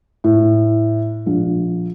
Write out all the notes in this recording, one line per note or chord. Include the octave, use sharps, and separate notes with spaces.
A2
A#1